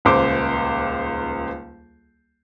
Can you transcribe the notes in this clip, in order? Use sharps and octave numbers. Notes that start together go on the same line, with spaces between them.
D#1 C#2 C5 D6